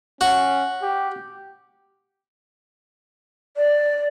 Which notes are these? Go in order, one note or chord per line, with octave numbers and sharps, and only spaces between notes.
C#4 F#4
G4
D5